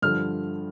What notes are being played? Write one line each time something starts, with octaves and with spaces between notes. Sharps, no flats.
G2 D3 F3 F6